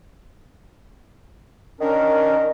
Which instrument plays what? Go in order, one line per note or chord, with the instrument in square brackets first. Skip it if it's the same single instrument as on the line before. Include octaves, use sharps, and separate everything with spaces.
[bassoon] D#3 [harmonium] C#4 D4 A#4